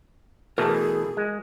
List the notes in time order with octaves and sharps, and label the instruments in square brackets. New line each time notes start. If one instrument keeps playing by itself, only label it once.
[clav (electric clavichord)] B2 E3 A3 [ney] G#4 [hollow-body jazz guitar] A#4 A5
[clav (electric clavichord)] G#3